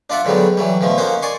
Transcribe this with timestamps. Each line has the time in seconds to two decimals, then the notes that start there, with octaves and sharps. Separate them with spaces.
0.10 D4 F4 D5 E5 F#5
0.25 G#2 D3 F#3 G3 B3
0.57 E3 F#3 G3
0.81 B2 D3 F3 A3
0.98 A#3 C#4 D#4 F#4 C5
1.22 D5 G#5 C6 C#6